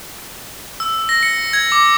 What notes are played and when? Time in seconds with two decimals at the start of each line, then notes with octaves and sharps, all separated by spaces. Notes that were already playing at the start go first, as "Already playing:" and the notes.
0.80 E6
1.09 A#6
1.23 C#7
1.53 G#6
1.72 D6